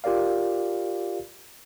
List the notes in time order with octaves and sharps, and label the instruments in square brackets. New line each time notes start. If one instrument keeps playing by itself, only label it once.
[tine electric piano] F4 G4 A#4 D5 F5